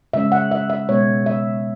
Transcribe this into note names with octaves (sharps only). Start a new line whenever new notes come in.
C#3 G#3 C#4 E5
F#5
E5
E5
B2 G#3 B3 C#5
E5